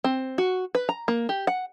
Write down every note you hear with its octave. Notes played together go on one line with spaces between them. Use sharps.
C4
F#4
B4
A#5
A#3
G4
F#5